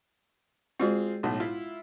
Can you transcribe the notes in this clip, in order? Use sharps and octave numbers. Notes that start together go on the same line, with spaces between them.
G#3 C4 F4 F#4 G#4
B1 A2
E4 F4 E5